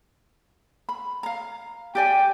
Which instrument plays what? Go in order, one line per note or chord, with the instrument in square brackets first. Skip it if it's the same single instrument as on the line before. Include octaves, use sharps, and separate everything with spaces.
[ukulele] B5
F5 A#5
[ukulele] G4 D5 G#5 [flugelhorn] G5